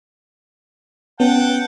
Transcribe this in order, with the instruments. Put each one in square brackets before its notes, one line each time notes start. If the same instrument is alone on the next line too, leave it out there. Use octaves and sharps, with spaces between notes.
[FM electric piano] B3 C#4 [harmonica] F#5 G5 A5